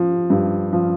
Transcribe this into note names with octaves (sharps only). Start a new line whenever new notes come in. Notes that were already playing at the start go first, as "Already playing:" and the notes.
Already playing: F3
G2
F3